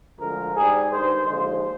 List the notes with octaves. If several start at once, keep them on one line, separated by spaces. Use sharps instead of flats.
D2 D3 F3 G#3 A#4
G#2 G3 G#4
G2 D#3 G#3 C5
D#2 D3 F3 G#3 C5